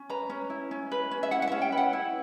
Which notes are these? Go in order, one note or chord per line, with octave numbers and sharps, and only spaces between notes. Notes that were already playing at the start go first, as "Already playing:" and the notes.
Already playing: C#4
B4 A#5
C#4
E4
C#4
B4
C#4
E5
E4 F#5
F#5
C#4 E5
G5
B4
F#5
E4